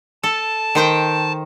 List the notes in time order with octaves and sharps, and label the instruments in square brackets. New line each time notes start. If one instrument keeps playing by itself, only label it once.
[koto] A4 [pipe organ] A5
[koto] D#3 C5 G5